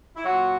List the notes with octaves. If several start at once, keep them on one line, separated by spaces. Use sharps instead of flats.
E4
A#2 F#3 F#4